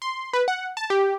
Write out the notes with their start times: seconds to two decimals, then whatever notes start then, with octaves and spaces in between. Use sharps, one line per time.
0.02 C6
0.33 B4
0.48 F#5
0.77 A5
0.90 G4